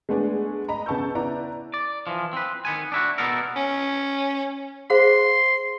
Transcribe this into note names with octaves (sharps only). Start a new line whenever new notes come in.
G#3 A3 B3 D4 G#4
D#5 A#5 B5
C#3 B3 A5 C#6 E6 G6
B3 E4 B4 D5 A#5
D5
E3 F3
C4 B4
D#3 B3 G#5
D4 E4 F#4
B2 B3 C4 E4 A4 A#4
C#4
G#4 C5 F5 C6